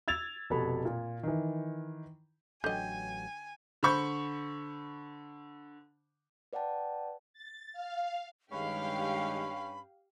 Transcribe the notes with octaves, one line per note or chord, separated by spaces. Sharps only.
E6 G#6 A6 F7
F1 B2 A4 B5
A#2
D#3 E3
A1 D3 F#3 D#5 G5 G#5 G6
D3 C5 B5 C#6 G6
B4 D5 F#5 G5 A5
A6
F5
G2 D#3 G#3 C#4 G4 F5 B5